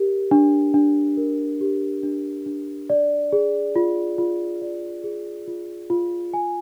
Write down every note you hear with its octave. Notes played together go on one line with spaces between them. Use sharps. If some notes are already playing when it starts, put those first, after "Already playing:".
Already playing: G4 A#4
D4
D4
A#4
G4
D4
D4
D5
G#4
F4
F4
D5
G#4
F4
F4
G#5